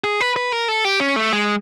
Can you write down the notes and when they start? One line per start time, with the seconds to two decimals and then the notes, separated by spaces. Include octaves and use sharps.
0.04 G#4
0.21 B4
0.36 B4
0.52 A#4
0.68 A4
0.84 G4
1.00 C#4
1.16 A3
1.33 G#3